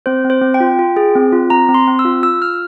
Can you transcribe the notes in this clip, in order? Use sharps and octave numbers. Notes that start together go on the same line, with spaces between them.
C4 C5
C4
C5
C4
G5
F4
F4
G#4
C4
F4
C4 A#5
C4
C6
C4
E6
F4
F4 E6
F4 F6